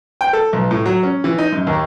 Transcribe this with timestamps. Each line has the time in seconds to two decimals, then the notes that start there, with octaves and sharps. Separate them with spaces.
0.21 G5
0.33 A4
0.53 B1
0.71 A2
0.86 F#3
1.03 C#4
1.24 E3
1.38 D#4
1.52 F#2
1.67 D#2